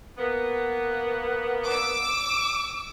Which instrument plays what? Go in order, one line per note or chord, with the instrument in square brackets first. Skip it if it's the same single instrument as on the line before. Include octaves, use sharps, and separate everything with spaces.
[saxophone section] A#3 B3
[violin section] D6 E6